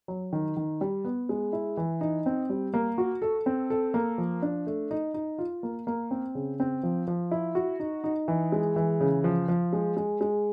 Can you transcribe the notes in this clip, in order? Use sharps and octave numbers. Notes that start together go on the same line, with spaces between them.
F#3
D#3
D#3
G3
B3
G#3
E4
E3
D#4
C4
G3
A#3
F#4
A4
C4
A4
A#3
F3
D4
A3
D#4
D#4
F4
A#3
A#3
C4
C#3
C4
F3
F3
E4
F#4
D#4
D#4
E3
G#3
E3
C#3
F3
F3
G#3
G#3
G#3